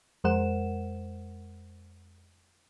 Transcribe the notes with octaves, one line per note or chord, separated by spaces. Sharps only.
F2 G#3 A#4 C5 F#5 E7